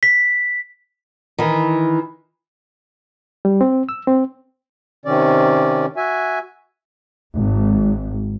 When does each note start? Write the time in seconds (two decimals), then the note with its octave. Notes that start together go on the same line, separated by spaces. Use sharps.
0.03 B6
1.38 D#3 E3
3.45 G3
3.61 C4
3.89 E6
4.07 C4
5.05 C3 D#3 C#4 D5
5.97 F#4 E5 G#5
7.36 G#1